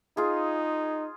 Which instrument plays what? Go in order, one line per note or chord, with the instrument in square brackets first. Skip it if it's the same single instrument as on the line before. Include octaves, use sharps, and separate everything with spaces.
[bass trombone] D#4 [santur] F4 G#4